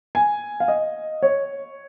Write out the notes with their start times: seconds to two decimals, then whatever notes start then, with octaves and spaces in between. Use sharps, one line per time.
0.15 G#5
0.60 F5
0.68 D#5
1.23 C#5